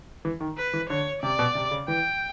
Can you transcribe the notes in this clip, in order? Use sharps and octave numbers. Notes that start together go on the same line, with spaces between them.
E3
D#3
B4
E3
D3 C#5
C3 D5
B2
C3
C#3
E3 G5